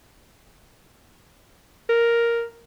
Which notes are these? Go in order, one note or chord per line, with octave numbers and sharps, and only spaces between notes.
A#4